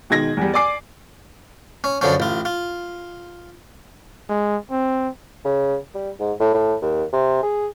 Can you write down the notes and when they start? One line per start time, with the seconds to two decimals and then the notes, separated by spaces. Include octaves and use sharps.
0.10 B2 D#3 G#3 G#6 A#6
0.37 E2 G3
0.54 D5 G#5 D6 C7
1.84 C#4
2.01 F#2 D3 F3 C#4
2.20 A1 F4
2.45 F4
4.29 G#3
4.71 C4
5.45 C#3
5.95 G3
6.20 G#2
6.40 A2
6.54 A2
6.82 D#2
7.13 C3
7.43 G#4